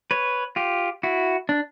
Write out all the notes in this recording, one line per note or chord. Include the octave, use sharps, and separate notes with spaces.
B4 C#5
F4 G4
E4 F#4
D4